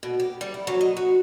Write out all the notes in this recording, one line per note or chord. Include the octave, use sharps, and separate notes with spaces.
B2
G4
G3
E4
F#3
D#5
F#4